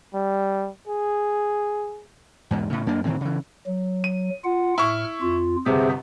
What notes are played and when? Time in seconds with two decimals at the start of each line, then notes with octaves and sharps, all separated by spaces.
0.14 G3
0.88 G#4
2.51 E2 G#2 B2
2.70 A2 C#3
2.87 F#2 A#3 D4
3.05 A2 D#3 E3 C4
3.21 C#3 E3
3.66 F#3
4.04 D#7
4.44 F4 F#5
4.78 A2 E4 C#6 F6
5.21 F2 F4
5.66 G1 C3 G#4 C5 E5